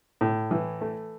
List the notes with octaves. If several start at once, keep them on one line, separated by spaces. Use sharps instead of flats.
A2
E3
A3